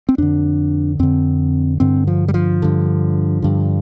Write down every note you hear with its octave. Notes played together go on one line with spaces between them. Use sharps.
C4
F2 D3 D4
F2 D3 C4
G2 D3 C4
F3
G3
F3
G2 D3
G2 D3